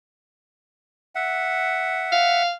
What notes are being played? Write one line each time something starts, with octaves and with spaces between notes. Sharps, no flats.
E5 F#5
F5